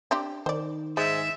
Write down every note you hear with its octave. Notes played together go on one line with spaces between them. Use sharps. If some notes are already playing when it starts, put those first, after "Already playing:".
C4 D4 G4
D#3 C5 D5
G#2 G#3 E5